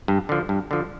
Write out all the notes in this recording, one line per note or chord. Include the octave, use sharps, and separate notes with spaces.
G2
D3 F3
G2
D3 F3